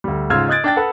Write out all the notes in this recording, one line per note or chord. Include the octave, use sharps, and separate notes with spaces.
D2 G3
G#2 C#3 F4 E6 F6 G#6
D#5 D#6 F#6 G#6 A6 D7
D4 G5 A6
A4 B4 F#5